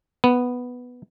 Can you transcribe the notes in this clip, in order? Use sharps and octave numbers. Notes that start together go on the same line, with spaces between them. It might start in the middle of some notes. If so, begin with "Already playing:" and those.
B3